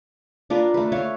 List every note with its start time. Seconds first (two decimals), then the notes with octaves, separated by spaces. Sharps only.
0.50 D4 F4 A#4 B4
0.74 A3 B4
0.92 C#5 E5 F5